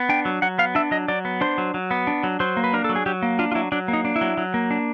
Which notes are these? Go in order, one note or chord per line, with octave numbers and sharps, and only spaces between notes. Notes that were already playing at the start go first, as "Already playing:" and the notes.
Already playing: B3
D4 G5
F#3
F#3 F#5
B3 F5
D4 E5
F#3 D#5
F#3 D5
B3
D4 C5
F#3
F#3
B3
D4
F#3
F#3 C5
A#3
B4
D4 A#4
F#3 A4
G#4
F#3 G4
A#3
D4 F4
F4
F#3 E4
F#3 D4
A#3
D#4
D4
E4
F#3
F#3
A#3
D4